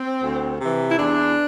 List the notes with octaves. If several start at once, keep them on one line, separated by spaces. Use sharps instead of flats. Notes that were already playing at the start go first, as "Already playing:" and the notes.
Already playing: C4
D2
C3 E3
E4
E2 D4